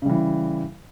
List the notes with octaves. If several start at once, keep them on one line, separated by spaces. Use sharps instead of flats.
C#3 E3 G3